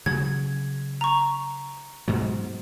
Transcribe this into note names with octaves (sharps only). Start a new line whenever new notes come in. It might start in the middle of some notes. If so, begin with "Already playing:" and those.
C#3 F#3 G#6
A#5 C#6
G#2 B2 F#3